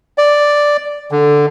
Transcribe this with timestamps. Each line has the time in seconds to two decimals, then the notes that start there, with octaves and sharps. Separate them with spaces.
0.18 D5
1.11 D3